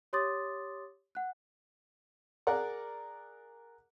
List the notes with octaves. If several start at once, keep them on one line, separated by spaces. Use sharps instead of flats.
G4 C#5 C6 D6 D#6 A6
F#5 F#6
G#4 A#4 D5 F#5